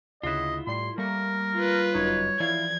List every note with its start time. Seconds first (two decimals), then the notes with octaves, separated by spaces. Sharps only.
0.23 D2 C#3 E4 F4 D#5 F#5
0.67 A2 G3 C6 C7
0.98 G3 A3 A#3 A#4 C#6
1.55 F4 B4
1.94 G1 F#2 D#4 C#5
2.40 E3 F3 E4 D5 F5 G#6